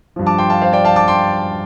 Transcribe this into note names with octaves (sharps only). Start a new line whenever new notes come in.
G2 F3
A5 D6
G5 C6
F5 A5
C5 F5
D5 G5
F5 A5
A5 D6
G5 C6